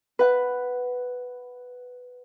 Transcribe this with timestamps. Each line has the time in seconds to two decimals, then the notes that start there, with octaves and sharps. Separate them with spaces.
0.19 B4 F#5